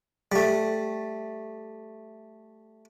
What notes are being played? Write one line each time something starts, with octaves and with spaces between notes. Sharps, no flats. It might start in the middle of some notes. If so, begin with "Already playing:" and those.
G3 A3